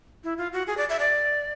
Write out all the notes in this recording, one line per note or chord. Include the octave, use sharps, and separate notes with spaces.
E4
F4
F#4
G#4
D5
E5
D5